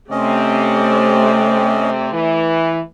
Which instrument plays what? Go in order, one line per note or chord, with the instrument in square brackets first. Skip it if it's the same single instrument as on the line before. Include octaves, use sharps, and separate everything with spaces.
[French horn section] C3 C4 [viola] A3 D5 [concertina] C#4 D#5
[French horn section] E3